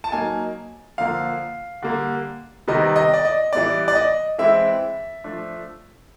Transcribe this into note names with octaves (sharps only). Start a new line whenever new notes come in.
A5
F#3 A#3 D#4 G#5
D3 F3 A#3 F5
D3 G3 A#3
C3 D#3 G3 B3 D#5
D#5
D5
D#5
E3 G3 B3 E4 D5
D5
D#5
E3 G#3 C4 E4 E5
F3 A3 D4